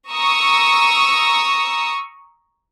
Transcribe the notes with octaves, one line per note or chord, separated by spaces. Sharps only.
A#5 C#6 D#6 E6